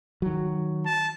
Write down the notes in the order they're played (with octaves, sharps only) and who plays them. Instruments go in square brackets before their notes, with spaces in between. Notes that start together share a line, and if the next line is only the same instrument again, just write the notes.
[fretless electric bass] D#3 F#3
[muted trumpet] A5